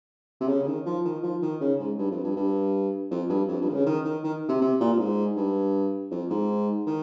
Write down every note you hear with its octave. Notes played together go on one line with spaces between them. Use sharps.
C3
C#3
C#3
D#3
F3
D#3
F3
D#3
C#3
G#2
G2
F2
G2
G2
F2
G2
F2
G2
D#3
C#3
D#3
D#3
D#3
C3
C3
A#2
A#2
G#2
G2
F2
G#2
D#3